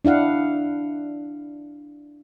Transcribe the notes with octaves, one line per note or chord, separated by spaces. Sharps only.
D4 E4 F5 F#5